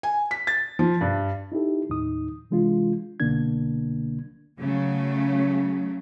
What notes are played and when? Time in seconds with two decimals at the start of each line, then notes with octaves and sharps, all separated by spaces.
0.03 G#5
0.31 B6
0.47 A6
0.79 F3
1.01 G2
1.52 D#4 E4 G4 A4
1.90 D#2 A2 D#4 D#6
2.51 C3 E3 G#3 D4 F4
3.20 C2 B2 D3 A#3 D4 G#6
4.59 C#3 F#3 A3